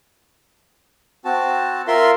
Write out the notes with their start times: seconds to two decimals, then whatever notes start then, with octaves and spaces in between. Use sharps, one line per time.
1.25 C4 F#4 A5
1.88 F4 A#4 E5 C6